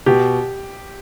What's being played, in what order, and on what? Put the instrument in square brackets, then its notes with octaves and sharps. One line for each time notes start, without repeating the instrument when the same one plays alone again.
[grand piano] B2 [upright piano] G4